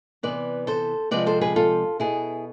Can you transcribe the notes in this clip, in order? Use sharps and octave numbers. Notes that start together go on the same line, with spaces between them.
C3 E3 B3 B4 D5
A4 C5
C3 F3 G#3 C4 B4 D5
A4 C5
G#4 B4
F4 A4
B2 B3 E4 G#4